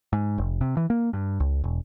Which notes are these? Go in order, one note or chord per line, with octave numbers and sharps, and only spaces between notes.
G#2
F1
C3
E3
A#3
G2
C#2
E1